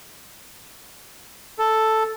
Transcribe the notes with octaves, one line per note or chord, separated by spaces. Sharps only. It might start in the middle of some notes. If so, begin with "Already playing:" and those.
A4